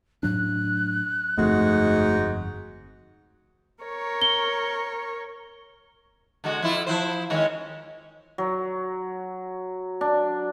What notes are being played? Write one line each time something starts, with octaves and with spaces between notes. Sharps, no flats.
A2 F#3 D4 F#6
G1 F2 G#2 A3 F#4 D#5
A#4 C#5 C#6
G7
D3 G#3 F#4
F2 E4 F4
F3 E4 C5
D#3 G#3 C#4
F#3
D4